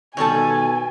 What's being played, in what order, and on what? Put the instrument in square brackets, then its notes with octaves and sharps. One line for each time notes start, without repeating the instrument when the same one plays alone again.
[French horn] B2 [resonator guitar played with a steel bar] D#3 G3 A4 [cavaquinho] C#5 A5 [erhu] G#5